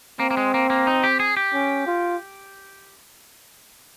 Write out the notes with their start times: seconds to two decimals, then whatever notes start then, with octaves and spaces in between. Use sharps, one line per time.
0.20 A#3 C4
0.31 A#3
0.37 G#3
0.54 A#3
0.70 A#3
0.87 D#4
1.04 G4
1.20 G#4
1.37 G4
1.53 C#4
1.87 F4